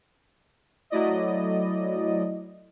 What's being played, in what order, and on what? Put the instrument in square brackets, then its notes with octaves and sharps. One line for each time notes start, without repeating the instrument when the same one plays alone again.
[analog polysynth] F#3 A3 E4 D5 D#5